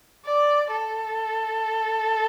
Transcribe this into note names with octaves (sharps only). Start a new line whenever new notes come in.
D5
A4